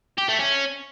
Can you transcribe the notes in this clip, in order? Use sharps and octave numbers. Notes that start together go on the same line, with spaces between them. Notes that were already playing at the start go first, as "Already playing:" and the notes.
G4
A3
C#4